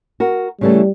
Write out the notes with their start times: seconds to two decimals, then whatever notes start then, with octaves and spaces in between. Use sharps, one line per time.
0.20 F#4 A#4
0.61 C#3 E3 G3 A3